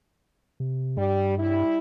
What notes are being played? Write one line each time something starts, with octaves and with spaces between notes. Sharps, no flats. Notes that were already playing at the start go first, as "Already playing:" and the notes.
C3
G2 G3
G3 E4